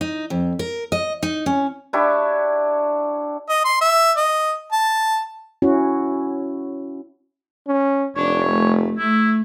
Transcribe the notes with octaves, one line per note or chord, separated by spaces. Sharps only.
D#4
F2
A#4
D#5
D#4
C#4
D4 E4 G4 C#5
D#5
C6
E5
D#5
A5
C#4 E4 F#4
C#4
F1 D4 C#5
A3
A3 E4